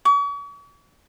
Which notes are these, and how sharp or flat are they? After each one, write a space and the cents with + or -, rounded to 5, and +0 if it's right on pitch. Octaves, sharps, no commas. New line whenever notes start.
C#6 +45